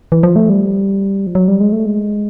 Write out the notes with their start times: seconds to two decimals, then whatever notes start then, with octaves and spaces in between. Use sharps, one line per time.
0.12 E3
0.23 F3
0.36 A3
0.49 G3
1.27 F3
1.35 F#3
1.48 G3
1.60 G#3
1.72 A3
1.86 G#3